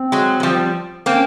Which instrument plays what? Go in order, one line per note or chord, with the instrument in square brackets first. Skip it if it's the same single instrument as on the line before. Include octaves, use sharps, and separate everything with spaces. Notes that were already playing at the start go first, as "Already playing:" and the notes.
Already playing: [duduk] C4
[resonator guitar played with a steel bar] F#3 G#3
G#3
F3 G3
[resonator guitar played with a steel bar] A#3 C4 [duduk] C#4